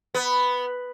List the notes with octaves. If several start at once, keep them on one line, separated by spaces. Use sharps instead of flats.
B3